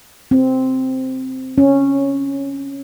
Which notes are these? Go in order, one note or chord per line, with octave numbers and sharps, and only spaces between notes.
C4
C#4